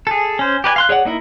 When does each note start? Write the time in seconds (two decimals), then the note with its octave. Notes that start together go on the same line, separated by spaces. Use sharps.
0.07 G#4 A4
0.39 C#4 C5
0.64 G4 B4 D5 G#5
0.76 F5 C6 F#6
0.89 G#4 C#5 D5 F#5
1.05 A#3 D#4 E4 A#4